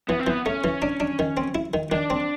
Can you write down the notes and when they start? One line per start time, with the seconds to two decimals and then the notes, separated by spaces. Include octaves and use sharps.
0.08 E3 B3
0.19 C4
0.27 E3 B3
0.46 A3 C#4
0.64 E3
0.82 D4
1.00 D4
1.19 D#3
1.37 C4
1.55 E4
1.74 D#3
1.91 D#3 D4
2.10 C4